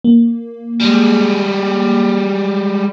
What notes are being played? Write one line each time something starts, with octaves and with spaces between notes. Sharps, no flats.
A#3
G3 G#3